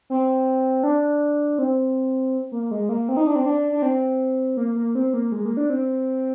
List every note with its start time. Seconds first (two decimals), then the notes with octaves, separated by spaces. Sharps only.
0.10 C4
0.83 D4
1.59 C4
2.52 A#3
2.71 G#3
2.89 A#3
3.09 C4
3.17 D#4
3.27 D4
3.36 C4
3.46 D4
3.72 D4
3.82 C4
4.57 A#3
4.76 A#3
4.95 C4
5.14 A#3
5.32 G#3
5.45 A#3
5.57 D4
5.70 C4